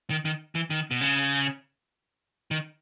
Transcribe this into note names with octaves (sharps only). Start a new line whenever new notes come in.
D#3
D#3
E3
D#3
B2
C#3
D#3